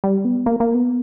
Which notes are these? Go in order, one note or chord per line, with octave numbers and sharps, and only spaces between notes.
G3
B3
A#3
A#3
B3